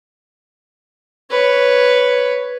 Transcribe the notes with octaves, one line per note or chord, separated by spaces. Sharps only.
B4 C#5